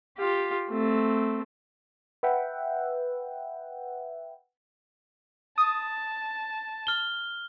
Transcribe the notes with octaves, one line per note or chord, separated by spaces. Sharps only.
F4 G4
A3 C4
B4 E5 F#5 G5
A5 D#6
F6 G7